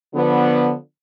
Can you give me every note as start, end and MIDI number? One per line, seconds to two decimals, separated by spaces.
0.14 0.74 50
0.14 0.74 53
0.14 0.74 59